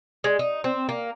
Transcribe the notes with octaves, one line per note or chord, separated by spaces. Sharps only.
G#3
D#4
C4
A#3